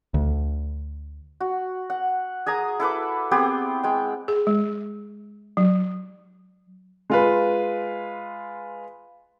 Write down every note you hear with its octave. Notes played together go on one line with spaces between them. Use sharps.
D2
F#4
F#5
G#4 G#5 A#5 D#6
E4 A4 B4 D6
B3 C4 G4 G#4
G#3 G5
G#4
G#3
F#3
G#3 F4 B4